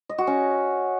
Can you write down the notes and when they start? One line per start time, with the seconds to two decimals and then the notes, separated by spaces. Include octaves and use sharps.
0.09 D#5
0.18 F#4
0.27 C#4